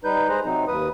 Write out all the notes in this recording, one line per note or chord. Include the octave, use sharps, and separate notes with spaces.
G3 D#4 B4 G6
G#3 G#4 C5 A#5 F#6
C3 F#3 C4 D#4
D#2 B4 D#6